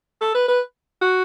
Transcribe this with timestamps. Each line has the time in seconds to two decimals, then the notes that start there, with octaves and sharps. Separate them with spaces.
0.21 A4
0.34 B4
0.48 B4
1.01 F#4